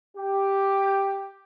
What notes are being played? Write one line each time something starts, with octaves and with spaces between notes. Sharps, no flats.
G4